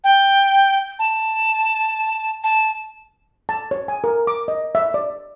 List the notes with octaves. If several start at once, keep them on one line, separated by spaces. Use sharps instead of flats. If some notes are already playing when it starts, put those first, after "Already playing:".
G5
A5
A5
A5
C#5
G#5
A#4
D6
D#5
E5
D5